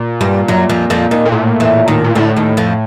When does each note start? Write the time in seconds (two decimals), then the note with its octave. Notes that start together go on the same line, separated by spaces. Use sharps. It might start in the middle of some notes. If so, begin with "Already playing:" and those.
Already playing: A#2
0.21 G2 G3
0.48 F#2 F#3
0.69 F2 F3
0.90 F2 F3
1.11 D#2 D#3
1.25 A#2
1.32 A2
1.60 E2 E3
1.88 D#2 D#3
2.04 A#2
2.15 D2 A2 D3
2.37 D#2 D#3
2.57 F2 F3